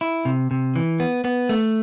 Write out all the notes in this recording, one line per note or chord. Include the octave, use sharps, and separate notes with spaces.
E4
C3
C3
E3
B3
B3
A3